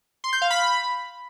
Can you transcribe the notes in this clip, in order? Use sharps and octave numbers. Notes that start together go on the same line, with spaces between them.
C6
G6
F5
B5